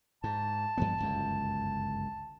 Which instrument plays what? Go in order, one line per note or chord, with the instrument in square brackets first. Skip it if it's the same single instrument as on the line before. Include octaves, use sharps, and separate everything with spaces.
[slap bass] G#2 [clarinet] A5
[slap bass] G2 F3 B3
G1 C#2 F#2